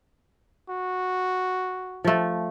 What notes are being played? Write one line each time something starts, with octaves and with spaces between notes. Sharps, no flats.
F#4
F3 A3